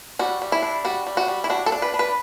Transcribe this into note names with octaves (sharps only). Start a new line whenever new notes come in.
G3 F#4
G3
E4
D4
G3 F#4
G3
F#4
G3
E4
D4 F#4
A4
D4
B4
D4
B4